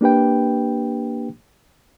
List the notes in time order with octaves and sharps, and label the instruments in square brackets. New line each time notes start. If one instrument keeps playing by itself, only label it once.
[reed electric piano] A#3 D4 G4 B4 G5